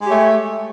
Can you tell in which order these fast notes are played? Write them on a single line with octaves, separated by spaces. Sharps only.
G#3 G4 C#5 A3